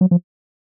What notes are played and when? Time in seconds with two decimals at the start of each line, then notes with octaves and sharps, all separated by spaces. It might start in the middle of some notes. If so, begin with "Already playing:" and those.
0.01 F#3
0.11 F3